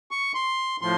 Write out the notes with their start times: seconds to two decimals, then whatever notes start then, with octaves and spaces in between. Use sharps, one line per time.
0.11 C#6
0.34 C6
0.81 A2 F3 C6